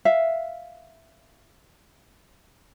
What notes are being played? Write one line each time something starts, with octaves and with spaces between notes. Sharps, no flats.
E5 F5